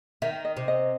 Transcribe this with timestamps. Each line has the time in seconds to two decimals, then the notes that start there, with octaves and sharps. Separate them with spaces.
0.22 D#3 E5
0.45 D#5
0.57 C3
0.68 D#5